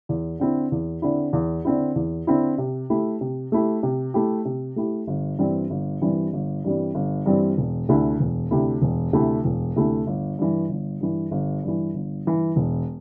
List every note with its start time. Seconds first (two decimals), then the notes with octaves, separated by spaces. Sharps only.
0.09 E2
0.40 D3 C4 E4
0.72 E2
1.02 D3 C4 E4
1.33 E2
1.65 D3 C4 E4
1.96 E2
2.27 D3 C4 E4
2.58 C3
2.90 A3 E4 G4
3.21 C3
3.52 A3 E4 G4
3.83 C3
4.14 A3 E4 G4
4.45 C3
4.76 A3 E4 G4
5.07 G1
5.39 G2 E3 G3 C4
5.70 G1
6.02 G2 E3 G3 C4
6.33 G1
6.64 G2 E3 G3 C4
6.94 G1
7.26 G2 E3 G3 C4
7.57 E1
7.88 D2 C3 A3 E4
8.20 E1
8.51 D2 C3 A3 E4
8.82 E1
9.13 D2 C3 A3 E4
9.44 E1
9.76 D2 C3 A3 E4
10.07 G1
10.39 G2 E3
10.69 G1
11.01 G2 E3
11.31 G1
11.63 G2 E3
11.94 G1
12.25 G2 E3
12.56 E1